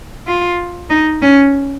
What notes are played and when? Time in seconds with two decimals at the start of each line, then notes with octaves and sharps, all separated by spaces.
0.27 F4
0.90 D#4
1.22 C#4